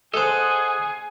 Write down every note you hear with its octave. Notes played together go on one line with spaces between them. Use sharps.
G#4 A4 C5 D#5 F#5